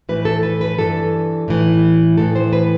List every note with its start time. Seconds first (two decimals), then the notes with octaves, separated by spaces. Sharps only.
0.09 A2 E3 B4
0.25 A4
0.43 B4
0.61 B4
0.78 G2 E3 A4
1.48 A2 E3
2.18 A2 E3 A4
2.36 C5
2.53 B4